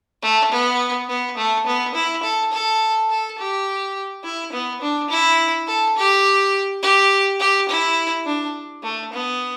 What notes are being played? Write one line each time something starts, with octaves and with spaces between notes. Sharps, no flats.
A3
B3
B3
A3
B3
E4
A4
A4
A4
G4
E4
B3
D4
E4
A4
G4
G4
G4
E4
D4
A3
B3